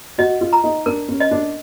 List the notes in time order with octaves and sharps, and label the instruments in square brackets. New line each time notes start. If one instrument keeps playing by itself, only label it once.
[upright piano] F#4 [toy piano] D#5
[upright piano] F4
[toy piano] A#5
[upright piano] D#4
[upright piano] D4 [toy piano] A#4
[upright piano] C#4
[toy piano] D#5
[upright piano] D4